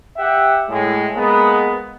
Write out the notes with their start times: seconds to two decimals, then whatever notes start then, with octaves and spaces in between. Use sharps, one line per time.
0.17 G4 E5 F#5 G5
0.69 A2 G#3
1.15 G#3 A#3 B3